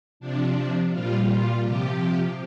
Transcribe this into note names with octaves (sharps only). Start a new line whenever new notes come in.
C3 F3 D4
A#2 G3 F4
F4
C3 F3 G4